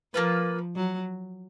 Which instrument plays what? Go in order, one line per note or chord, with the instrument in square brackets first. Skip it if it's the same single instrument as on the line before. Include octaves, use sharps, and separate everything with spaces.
[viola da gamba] F3 [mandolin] A#3 F4 B4
[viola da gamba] F#3